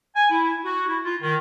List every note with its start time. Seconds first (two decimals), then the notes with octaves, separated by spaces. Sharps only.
0.16 G#5
0.30 E4
0.65 F#4
0.88 E4
1.05 F4
1.21 D#3